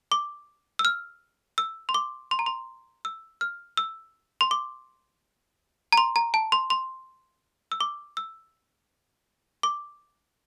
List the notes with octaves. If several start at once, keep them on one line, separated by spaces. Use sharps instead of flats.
D6
E6
F6
E6
C6
D6
C6
A#5
C6
E6
F6
E6
C6
D6
A#5
C6
A#5
A5
C6
C6
E6
D6
E6
D6